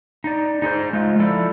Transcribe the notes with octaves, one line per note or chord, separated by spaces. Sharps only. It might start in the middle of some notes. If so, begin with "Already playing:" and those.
D#4 D5
D#4 G#4 A4 C5
G#3 F4
F3 E4 A4 D5